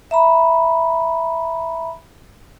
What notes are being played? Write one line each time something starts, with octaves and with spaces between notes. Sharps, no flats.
E5 A#5 B5